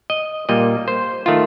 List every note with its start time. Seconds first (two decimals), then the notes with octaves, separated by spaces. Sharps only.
0.10 D#5
0.49 A#2 G3 A#3 D#5
0.88 C5
1.26 D#3 A3 F4